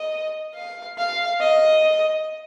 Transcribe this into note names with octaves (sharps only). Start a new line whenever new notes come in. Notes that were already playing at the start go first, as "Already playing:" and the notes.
Already playing: D#5
F5
F5
D#5